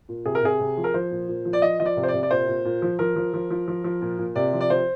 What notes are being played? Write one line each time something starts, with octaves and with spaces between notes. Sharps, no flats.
A#2
C3 G#4
A#4
C3 G#4
C3
F3
A#4
F3 C5
A#2
A#2
F3
D5
F3 D#5
F3 D#5
D5
C3
C5
D5
C3
D5
A#2 C5
A#2
A#2
F3
F3 A#4
F3
F3
F3
F3
F3
A#2
A#2
C3 D5
F3
D5
F3 C5